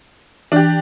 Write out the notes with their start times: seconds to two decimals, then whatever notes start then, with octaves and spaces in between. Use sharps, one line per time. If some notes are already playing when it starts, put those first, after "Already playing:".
0.52 E3 D4 G4